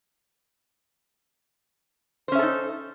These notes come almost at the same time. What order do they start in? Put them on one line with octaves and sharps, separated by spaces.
C5 C#4 E5 A4 D#4